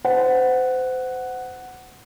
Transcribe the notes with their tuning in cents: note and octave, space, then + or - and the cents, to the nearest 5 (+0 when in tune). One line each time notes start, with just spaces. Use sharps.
C5 -30 F#5 +0